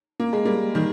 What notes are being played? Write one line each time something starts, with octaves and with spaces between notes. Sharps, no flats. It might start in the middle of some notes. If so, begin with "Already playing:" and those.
A#3
G#3
G3 A#3
D#3 G3